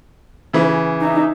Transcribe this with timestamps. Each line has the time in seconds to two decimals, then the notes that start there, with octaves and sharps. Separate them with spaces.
0.53 C#3 E3
1.01 D#4 E5